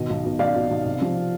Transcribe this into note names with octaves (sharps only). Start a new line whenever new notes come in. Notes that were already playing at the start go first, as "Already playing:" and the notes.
Already playing: B2 D#3 D#5
B1
B2
B1 D5 F5
B2
B1
C3
F3